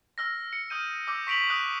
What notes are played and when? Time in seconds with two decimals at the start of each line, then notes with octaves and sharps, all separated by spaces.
0.18 E6 F6 A#6
0.53 C#7
0.70 D#6 F6 G6 D#7
1.07 D6 E6 G6
1.27 C#6 B6 D7 F7 F#7
1.50 D#6 F#6